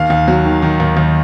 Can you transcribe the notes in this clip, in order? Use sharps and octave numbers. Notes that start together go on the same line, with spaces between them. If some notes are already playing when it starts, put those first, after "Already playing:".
Already playing: D#2 F5
D#2
F#3
D#3
D#3
D#2
D#2